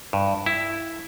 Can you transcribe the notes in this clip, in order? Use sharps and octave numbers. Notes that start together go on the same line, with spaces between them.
G2
E4